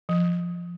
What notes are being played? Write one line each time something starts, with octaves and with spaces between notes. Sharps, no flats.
F3